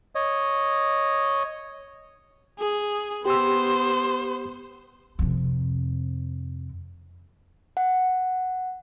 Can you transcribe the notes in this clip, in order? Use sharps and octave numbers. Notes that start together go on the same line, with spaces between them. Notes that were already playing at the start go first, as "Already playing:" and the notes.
C#5 D#5
G#4
B3 G4 C5 C6 E6
F2 C3
F#5